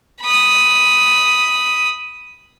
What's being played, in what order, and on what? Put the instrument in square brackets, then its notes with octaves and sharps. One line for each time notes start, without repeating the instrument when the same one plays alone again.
[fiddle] B5 D#6